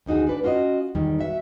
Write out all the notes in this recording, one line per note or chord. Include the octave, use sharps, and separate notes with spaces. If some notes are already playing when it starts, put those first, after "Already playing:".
D2 D#3 D#4 F#4 G#4
D4 B4 D5
C#4 F4 F#4 C#5 D#5
E2 D#3 G3
F#4 E5